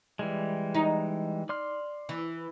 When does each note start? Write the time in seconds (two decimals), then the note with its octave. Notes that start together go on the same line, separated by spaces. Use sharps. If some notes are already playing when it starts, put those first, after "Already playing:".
0.19 E3 G3 G#3
0.75 D#4
1.49 D5 C6 F6
2.09 E3